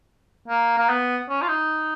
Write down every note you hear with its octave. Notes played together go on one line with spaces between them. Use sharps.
A#3
A#3
B3
C#4
F4
D#4